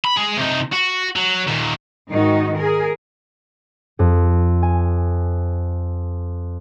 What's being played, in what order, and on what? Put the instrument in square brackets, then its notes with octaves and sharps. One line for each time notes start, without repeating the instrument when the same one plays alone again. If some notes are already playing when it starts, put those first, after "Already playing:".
[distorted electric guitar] B5
G#3 G#4
C3 D#4
F#4
F#3
D#2 A#2
[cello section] G#2 D#3 D#4 F#4
G#4 A#4
[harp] F2
G#5